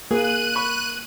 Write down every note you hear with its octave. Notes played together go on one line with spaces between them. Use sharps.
A#3 G#4 F#6 D#7
B5 C#6